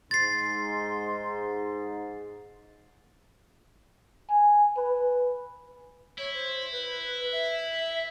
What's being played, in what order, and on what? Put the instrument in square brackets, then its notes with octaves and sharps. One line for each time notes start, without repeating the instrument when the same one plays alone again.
[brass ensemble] G#2 [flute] C6 [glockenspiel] A6 C7
[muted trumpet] G#5
B4
[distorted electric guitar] E4 [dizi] C#5
[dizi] C5
B4
E5